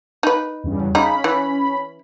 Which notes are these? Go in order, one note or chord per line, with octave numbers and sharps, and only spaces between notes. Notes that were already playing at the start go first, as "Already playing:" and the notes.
D#4 B4
E2 G2 C#3
C#3 C#4 D#4 B5
E3